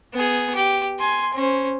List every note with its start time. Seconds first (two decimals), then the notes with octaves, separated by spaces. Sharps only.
0.14 B3 G#4
0.55 G4
1.00 G#5 C6
1.34 C#4 C5